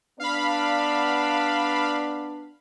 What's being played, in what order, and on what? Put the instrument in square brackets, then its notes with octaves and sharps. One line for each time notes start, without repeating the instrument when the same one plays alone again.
[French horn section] B3 D4 [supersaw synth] F5 B5